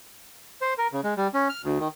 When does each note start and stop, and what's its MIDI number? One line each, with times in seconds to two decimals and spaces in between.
0.61 0.74 72
0.78 0.87 70
0.92 1.01 49
1.04 1.14 56
1.17 1.28 55
1.34 1.48 61
1.49 1.62 89
1.64 1.78 38
1.80 1.88 51